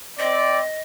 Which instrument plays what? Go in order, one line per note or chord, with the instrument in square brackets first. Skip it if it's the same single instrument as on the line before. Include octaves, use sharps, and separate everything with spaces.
[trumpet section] C4 D5 [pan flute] D#5